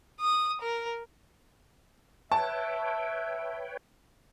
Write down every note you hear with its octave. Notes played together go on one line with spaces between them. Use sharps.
D#6
A#4
B4 C#5 E5 G5 A5